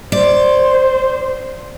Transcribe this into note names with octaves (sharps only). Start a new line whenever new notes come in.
C5 D5